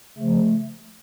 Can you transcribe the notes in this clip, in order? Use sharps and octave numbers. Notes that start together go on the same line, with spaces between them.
C#3 F3 A3